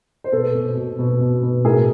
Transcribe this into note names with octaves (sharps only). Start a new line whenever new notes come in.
C5
B2 A4 B4
B2
B2
B2
B2
B2
A2 G#4 A#4